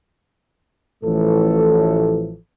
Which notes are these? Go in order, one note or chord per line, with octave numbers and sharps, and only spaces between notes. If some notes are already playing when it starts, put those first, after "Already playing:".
A1 A2 E3 F3 A3 A4